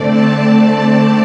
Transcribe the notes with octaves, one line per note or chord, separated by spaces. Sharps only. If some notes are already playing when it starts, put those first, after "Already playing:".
Already playing: D3 A3 C4 D5
A5